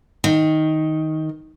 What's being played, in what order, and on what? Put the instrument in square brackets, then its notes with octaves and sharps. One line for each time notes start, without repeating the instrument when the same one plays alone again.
[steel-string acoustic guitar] D#3